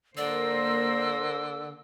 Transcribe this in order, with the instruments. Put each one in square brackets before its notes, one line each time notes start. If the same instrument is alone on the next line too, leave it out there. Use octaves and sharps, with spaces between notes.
[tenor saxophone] D3 [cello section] A#3 A#4 C5 [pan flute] D5 [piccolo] E6